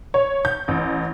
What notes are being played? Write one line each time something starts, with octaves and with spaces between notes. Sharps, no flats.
C#5
G6
A1